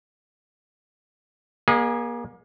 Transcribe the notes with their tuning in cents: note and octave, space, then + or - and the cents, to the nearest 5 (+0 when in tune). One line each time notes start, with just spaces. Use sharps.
A#3 +35 G#4 -15 D#5 -10